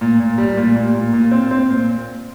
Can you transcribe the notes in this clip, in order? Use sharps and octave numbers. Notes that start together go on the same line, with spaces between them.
A#2
A#2
G3
A#2
A#2
A#2
A#2
C4
C4
A#2